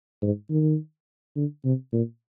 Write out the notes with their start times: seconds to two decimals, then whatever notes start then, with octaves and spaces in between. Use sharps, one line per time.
0.22 G#2
0.50 D#3
1.36 D3
1.65 C3
1.93 A#2